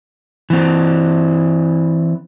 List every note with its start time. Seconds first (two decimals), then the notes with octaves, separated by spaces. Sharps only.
0.50 E3 C4